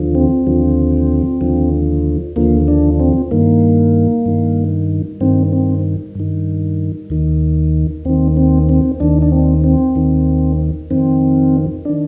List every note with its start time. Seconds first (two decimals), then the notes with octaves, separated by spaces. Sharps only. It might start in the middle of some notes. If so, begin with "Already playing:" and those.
Already playing: D#2 D3 F3
0.15 C4
0.47 D#2 D3 F3
1.41 D#2 D3 F3
2.36 D#2 D3 F3 A#3
2.68 D4
3.00 C4
3.31 G2 D#3 A#3
4.26 G2 D#3
5.21 G2 D#3 C4
5.52 C4
6.15 G2 D#3
7.10 D#2 D#3
8.05 D#2 D#3 C4
8.37 C4
8.69 C4
9.00 D#2 D#3 D4
9.22 D4
9.32 C4
9.64 C4
9.96 D#2 D#3
10.90 F2 D#3 C4
11.85 D#3 D4